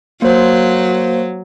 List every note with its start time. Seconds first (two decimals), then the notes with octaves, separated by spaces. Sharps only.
0.22 F#3 A#3 C5